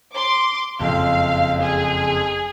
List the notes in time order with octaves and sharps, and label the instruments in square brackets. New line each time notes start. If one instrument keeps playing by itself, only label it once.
[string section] C6 D6
[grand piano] F#1 F2 [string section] F5
[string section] G#4